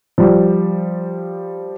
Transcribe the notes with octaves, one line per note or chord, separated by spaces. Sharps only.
F3 G3